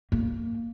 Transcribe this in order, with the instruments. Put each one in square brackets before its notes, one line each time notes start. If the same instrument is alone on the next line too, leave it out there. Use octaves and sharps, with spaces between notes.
[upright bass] A#3